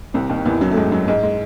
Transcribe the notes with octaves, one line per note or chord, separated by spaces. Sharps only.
C2 C3
D#2 D#3
E2 E3
F#2 F#3
A3
G#2 G#3
F#2 F#3
G#2 G#3
G#3